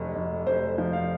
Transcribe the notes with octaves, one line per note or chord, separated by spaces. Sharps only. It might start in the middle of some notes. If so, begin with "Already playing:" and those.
Already playing: F1 F2
F1
F1 C5
F3
F5